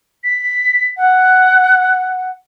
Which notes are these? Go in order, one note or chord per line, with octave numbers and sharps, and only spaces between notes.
B6
F#5